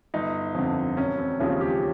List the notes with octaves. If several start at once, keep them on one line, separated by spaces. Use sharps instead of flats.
G1 D#4
F2 D3
E1 C#4
C4
D#2 C#3 F3 G#3 C#4
G4